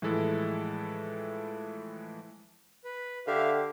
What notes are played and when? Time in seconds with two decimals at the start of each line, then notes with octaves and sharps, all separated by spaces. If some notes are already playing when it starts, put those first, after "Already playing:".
0.02 A2 E3 F3 G#3 E4 A4
2.84 B4
3.27 D3 G4 E5 F5
3.52 G4